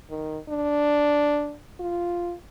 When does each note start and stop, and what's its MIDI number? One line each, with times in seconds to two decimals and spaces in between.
0.10 0.39 51
0.49 1.56 62
1.80 2.34 65